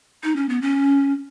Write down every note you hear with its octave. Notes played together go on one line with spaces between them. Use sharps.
D#4
C#4
B3
C#4